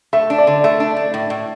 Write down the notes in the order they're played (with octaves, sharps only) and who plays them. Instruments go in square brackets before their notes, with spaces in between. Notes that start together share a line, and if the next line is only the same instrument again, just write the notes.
[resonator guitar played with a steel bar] A3 [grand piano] E5
[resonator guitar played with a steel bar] D4
[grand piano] D5
[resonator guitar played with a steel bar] D3
[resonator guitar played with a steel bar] A3 [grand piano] E5
[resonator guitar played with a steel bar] D4
A3
A2
A2